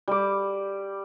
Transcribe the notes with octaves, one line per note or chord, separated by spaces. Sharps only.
G3 D6